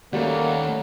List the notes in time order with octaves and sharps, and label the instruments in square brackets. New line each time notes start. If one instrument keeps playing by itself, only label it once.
[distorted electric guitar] D#2 [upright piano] G3 A3 C#4 [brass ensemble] A#3 [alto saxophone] F#5